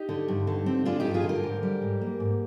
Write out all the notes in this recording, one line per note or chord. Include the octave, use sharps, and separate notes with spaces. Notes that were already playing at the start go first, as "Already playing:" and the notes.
Already playing: D#4 G4
D3
G2
D3
C4
G#3 D4 F4
G2 D#4 G4
F4 G#4
D3
G4 A#4
G#2
G3
G#2
A#3
G#2